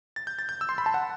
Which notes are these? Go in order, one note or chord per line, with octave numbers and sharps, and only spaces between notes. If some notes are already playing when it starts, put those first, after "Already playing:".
A6
G6
A6
G6
E6
C6
B5
A5
F#5